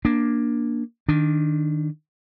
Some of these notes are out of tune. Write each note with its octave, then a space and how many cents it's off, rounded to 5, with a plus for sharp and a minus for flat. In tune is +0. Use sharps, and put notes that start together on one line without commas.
A#3 +15 D4 +0
D#3 -5 D4 +0